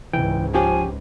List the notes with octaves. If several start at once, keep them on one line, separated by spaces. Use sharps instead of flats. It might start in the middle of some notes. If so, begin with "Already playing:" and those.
C#2 G#2 E3 G5
F3 C#4 G4 G#5